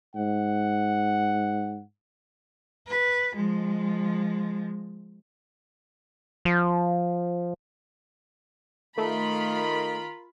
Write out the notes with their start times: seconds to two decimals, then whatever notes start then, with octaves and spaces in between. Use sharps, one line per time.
0.16 G#2 F#5
2.87 B4
3.36 F3 G#3
6.45 F3
8.98 D#3 A3 F4 A#4 B5